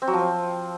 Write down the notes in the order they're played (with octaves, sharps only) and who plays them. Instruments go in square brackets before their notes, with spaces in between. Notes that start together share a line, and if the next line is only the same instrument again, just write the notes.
[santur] C4
F#3
F3
C4